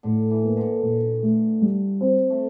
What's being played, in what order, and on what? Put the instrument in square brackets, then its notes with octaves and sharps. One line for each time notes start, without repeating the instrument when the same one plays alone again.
[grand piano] A2 [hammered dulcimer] D3
[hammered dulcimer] E3
[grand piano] A#3
[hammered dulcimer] D3
[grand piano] A#2
A3
G3
C4
[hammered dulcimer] A3